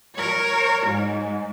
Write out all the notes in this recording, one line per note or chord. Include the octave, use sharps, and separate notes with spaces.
A#4 C#5
G#2